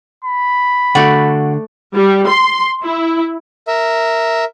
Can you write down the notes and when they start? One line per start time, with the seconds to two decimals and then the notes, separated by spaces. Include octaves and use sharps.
0.24 B5
0.95 D3 A3 F#4 D5
1.96 G3
2.29 C6
2.85 E4
3.67 A#4 E5